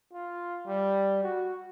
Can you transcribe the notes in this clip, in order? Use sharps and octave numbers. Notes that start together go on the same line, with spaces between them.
F4
G3
F#4